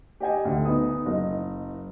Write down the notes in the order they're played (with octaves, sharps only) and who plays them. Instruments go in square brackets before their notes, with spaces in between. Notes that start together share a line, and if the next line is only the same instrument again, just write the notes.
[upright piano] G4 D#5 G5 G#5
D2 D3
B3 D#4 D#6
F#1 D#5